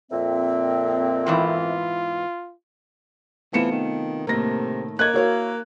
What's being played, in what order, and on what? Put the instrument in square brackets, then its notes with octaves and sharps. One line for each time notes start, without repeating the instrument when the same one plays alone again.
[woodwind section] F2 A#2 C4 [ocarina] E5
[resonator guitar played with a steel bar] E2 G#2 E3 [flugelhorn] F4
[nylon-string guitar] C3 A3 F4 [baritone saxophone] E3 [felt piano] B3 C#7 E7
[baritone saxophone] D#3
[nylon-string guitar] A2 D#3 A3 [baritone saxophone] C3 [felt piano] A#3 A#6
[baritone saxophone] A#3 [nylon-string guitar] C#5 D#5 [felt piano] F#6 G#6
[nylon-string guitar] E4 A#4 F5 [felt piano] F#4 C#5